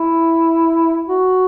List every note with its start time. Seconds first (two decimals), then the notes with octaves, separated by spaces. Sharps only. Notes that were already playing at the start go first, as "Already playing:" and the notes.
Already playing: E4
1.09 F#4